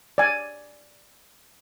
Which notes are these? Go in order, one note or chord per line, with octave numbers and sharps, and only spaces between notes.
D5 G#5